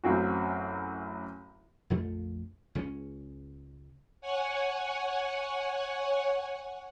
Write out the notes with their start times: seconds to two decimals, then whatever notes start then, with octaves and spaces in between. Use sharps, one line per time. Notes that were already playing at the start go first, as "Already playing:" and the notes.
0.04 A1 F#2 C4 F#4
1.90 A#1 F2 A3
2.75 C#2 G#3 A3 C#4
4.21 C#5 F#5 G#5